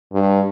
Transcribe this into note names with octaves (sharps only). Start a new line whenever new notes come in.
G2